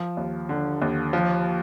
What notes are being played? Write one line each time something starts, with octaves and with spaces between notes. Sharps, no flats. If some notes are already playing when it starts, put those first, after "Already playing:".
Already playing: F3
D#2
D3
D#2
F3